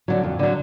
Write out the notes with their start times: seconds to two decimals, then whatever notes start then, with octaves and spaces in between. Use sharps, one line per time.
0.08 D3 F#3
0.23 F2
0.39 D3 F#3